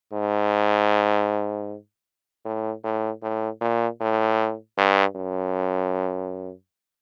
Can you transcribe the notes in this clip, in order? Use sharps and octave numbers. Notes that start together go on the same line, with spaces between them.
G#2
A2
A2
A2
A#2
A2
G2
F#2